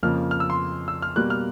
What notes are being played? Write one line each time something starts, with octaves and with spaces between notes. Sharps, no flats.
F2 C#3 F3 A#3 F6
F6
E6
C6
E6
F6
B2 G3 A#3 F#6
F6